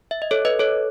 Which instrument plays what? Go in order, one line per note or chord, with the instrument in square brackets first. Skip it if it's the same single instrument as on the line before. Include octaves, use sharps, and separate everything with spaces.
[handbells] E5
D#5
A4 C#5
B4 D#5
A4 C#5